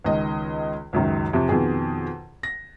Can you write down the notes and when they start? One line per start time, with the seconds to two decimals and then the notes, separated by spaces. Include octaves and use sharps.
0.04 C#2 D#3 D#5
0.93 C#2 F#2 D#3
1.33 F2 C3
1.49 F2 B2 D#3 G#4
2.43 A#6